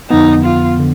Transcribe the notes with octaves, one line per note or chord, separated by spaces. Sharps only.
F2 D3 F3 B3 D#4
F4
D3